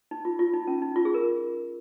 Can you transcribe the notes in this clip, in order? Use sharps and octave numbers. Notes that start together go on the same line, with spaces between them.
D#4
F4
F4
D#4
C#4
D#4
F4
G#4
A#4